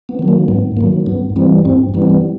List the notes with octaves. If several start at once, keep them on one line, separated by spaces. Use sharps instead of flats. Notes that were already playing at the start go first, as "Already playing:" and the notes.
B3
D#3 F#3
A#3
G#2 B3
D#3 F#3 A#3
G2 B3
E3 G3 C4
G2 C4
E3 G3 B3
C4
B3